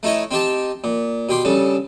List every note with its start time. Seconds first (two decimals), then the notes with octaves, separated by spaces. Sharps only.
0.03 A3 D#4 E4 C#5 D#5
0.31 C4 D#4 G4 A5
0.84 A#2
1.29 B2 G4 C6 D6
1.45 G2 C#3 A4